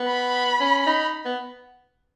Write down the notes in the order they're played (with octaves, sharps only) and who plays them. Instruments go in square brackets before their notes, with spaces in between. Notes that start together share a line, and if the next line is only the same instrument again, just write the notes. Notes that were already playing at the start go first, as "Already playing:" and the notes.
Already playing: [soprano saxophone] B3
[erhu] B5
[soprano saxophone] C#4
D#4
B3